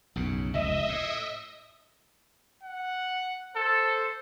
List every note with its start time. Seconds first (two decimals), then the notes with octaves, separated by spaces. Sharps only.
0.16 B1 F#2 C#3
0.54 F1 C#2 D#5 E5
0.89 A2
2.63 F#5
3.56 A4 C5